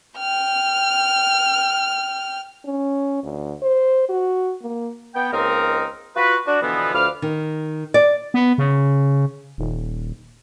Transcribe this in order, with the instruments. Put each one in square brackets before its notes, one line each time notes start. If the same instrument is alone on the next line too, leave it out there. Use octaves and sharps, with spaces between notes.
[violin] G5 F6
[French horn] C#4
D2
C5
F#4
A#3
[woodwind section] B3 G5
C#2 A#3 C4 D#4 A#4
F4 F#4 B4
D4 F#4
B2 D3 E3 F3 B3
D2 F3 B4 F5 D6 F6
[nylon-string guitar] D#3
D5
[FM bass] B3
C#3
D#1